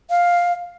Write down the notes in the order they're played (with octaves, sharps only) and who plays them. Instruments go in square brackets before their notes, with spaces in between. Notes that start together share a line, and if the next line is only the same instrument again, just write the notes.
[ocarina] F5